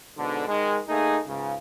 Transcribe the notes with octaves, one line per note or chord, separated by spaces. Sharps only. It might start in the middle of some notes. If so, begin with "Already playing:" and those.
G#2 B2 D3
D#3 G#3
A3 A#3 D#4 G#4
C#2 G#2 C#3